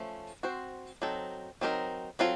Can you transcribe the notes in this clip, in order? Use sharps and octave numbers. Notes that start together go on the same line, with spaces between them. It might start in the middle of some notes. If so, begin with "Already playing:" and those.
Already playing: F3 A3 C#4
C4 F#4 C5
F#3 C4 D#4 A4
F#3 C4 D#4 A#4
F#3 C4 F4 A4